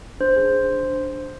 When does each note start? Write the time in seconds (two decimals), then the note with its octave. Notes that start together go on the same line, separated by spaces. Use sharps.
0.20 D4 C5
0.36 G#4
0.53 D4